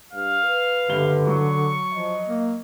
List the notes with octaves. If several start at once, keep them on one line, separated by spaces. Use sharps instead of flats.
G2 F5
B4
F#1 G2 D3 G7
F#3 C#6
F3 D#5
A#3